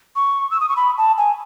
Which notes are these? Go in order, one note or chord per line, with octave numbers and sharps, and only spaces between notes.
C#6
E6
D#6
C#6
B5
A5
G#5